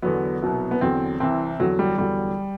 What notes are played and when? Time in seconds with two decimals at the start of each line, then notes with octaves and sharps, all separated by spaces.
0.02 E2 D3 F#3 B3
0.42 C2 B2 F#3
0.71 B3
0.81 E2 D3 F#3 C4
1.20 C2 C3 E3 C4
1.60 E2 D3 F#3
1.79 G3
1.98 E2 D3 F#3 G3